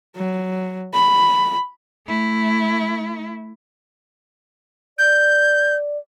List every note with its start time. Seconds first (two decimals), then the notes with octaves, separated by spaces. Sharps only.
0.16 F#3
0.93 B5
2.06 A3 E4
4.98 D5 G6